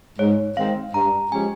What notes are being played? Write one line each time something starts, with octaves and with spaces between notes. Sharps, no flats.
G#2 C#5
D#3 G#3 C4 F5
G2 A#5
F3 G#3 C#4 G4 G#5